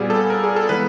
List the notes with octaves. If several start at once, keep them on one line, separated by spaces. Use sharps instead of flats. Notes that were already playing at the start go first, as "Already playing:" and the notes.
Already playing: A#2 G3 B3 G#4
A4
A#4
G#4
A4
E3 G#3 B3 B4